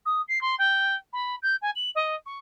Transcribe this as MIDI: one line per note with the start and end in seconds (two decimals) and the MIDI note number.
0.05 0.21 87
0.28 0.41 96
0.41 0.55 84
0.58 0.95 79
1.13 1.35 83
1.42 1.55 91
1.61 1.70 80
1.75 1.90 102
1.95 2.15 75
2.25 2.38 85